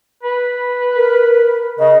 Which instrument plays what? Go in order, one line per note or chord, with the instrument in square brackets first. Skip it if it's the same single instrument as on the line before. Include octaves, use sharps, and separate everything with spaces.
[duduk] B4
[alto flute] A#4
[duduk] C#3 [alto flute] D#5